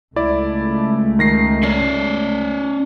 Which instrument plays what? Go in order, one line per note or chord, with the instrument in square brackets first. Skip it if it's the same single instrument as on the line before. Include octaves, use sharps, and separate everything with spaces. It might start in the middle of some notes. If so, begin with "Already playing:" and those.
[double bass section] C#2 A3 [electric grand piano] E4 D5
[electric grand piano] D#3 A#6 C7
[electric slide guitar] C#4 C#5 D5 [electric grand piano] C7